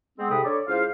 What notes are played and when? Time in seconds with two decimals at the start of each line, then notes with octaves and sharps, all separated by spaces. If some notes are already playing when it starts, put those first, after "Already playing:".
0.18 G#3 B3 C4
0.30 G#2 C3 A4 G5 B5 D#6
0.44 D4 A4 C#5 D5
0.68 C#2 E4 C5 F5